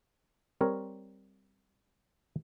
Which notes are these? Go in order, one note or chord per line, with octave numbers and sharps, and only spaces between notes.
G3 C4 A#4 C#5